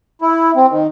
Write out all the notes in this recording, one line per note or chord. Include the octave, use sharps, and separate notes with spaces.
E4
C4
D#3